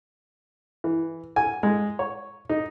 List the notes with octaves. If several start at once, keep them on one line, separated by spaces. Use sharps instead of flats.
E3
G#5
G#3
C#5
D#4